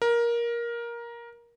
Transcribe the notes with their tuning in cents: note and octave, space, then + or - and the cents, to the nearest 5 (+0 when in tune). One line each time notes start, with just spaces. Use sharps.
A#4 +15